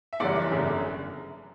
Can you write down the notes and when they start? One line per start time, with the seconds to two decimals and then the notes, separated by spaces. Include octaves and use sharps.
0.13 E5
0.20 F#1 F#2 E3 G3 C#4 D5 F#5
0.36 E5
0.52 G1 F#2 C#3